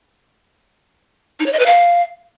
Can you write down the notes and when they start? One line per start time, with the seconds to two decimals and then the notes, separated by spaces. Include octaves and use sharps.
1.40 D#4
1.46 C#5
1.53 D#5
1.59 B4
1.66 F5